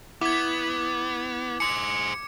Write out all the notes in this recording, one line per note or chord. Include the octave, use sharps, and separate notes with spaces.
B3 E4 D6 G#6
G#4 C5 C#7